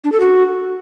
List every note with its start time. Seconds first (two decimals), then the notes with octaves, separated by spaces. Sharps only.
0.04 D4
0.12 A4
0.20 F#4